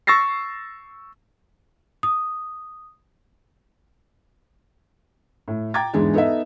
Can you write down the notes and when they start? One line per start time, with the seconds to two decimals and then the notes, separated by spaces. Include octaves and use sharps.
0.07 C#6 E6 A6 A#6 C7
2.03 D#6
5.48 A2
5.74 G5 A#5 D6 G#6 A6
5.93 E2 G#2 E3 G#3 B3 D4
6.14 B3 D#4 A4 D#5 E5